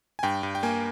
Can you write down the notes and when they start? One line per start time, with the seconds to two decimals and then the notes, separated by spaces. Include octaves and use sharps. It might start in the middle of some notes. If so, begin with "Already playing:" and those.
0.19 G#5
0.23 G2 G5
0.43 G2
0.55 G5
0.63 A#3 G#5